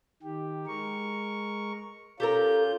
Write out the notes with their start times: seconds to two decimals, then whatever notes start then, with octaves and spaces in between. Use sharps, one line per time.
0.23 D#3 G4
0.67 G#3 A#4 C#6
2.20 C#4 F4 G4 A4 A#4 G6